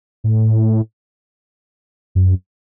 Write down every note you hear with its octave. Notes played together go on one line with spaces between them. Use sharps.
A2
F#2